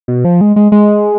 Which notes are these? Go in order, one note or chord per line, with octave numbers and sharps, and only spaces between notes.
B2
F3
G#3
G#3
G#3